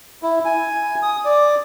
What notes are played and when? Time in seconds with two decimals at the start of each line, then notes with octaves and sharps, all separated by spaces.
0.23 E4
0.45 G#5
1.03 D#6
1.25 D5